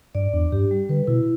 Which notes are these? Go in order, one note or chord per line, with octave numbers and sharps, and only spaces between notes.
G2 D5
E2 D4
G2 G4
G3
D3 B4
B2 E4